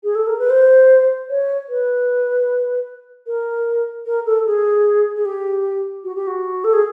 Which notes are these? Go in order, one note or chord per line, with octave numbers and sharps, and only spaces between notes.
G#4
A4
A#4
B4
C5
C#5
B4
A#4
A#4
A4
G#4
G#4
G4
F#4
G4
F#4
A4
G#4